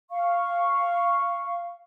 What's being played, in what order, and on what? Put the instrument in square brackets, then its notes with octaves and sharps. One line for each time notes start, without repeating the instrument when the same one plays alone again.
[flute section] F5 C#6